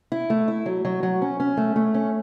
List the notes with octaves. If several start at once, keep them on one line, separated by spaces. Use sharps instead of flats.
E4
A3
E4
F#3
F#3
F#3
C#4
C#4
A3
A3
C#4